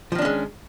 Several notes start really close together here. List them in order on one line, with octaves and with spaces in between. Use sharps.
F3 D#3 D4 C#4 G#3